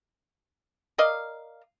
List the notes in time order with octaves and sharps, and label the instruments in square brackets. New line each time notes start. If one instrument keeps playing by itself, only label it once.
[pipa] A#4 D5 D#5 F5